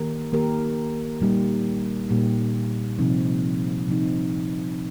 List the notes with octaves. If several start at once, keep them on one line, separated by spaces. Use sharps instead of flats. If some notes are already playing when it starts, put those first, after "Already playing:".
Already playing: D#3 A#3 G4 A#4
D#3 A#3 G4 A#4
A#2 G3 A#3 D#4 G4
A#2 G3 A#3 D#4 G4
C3 F3 C4 D#4
C3 F3 C4 D#4